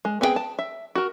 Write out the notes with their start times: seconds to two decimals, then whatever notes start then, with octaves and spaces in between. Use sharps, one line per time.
0.05 G#3
0.21 B3 C4 D4 G#4 G5
0.36 A5
0.59 E5
0.95 F#4 A#4